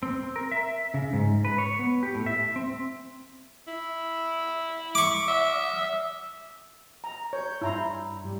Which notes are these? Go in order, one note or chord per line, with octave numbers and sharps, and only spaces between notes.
C4
A#4
E5
C#3
G#2
B4
C#5
B3
G4
A2
E5
C4
E4
C#6 D6
E5
A#5
C#5 G6
G2 E4 A#5 C6
G3